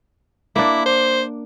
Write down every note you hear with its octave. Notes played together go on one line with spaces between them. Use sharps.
A#3 D4 E4
C5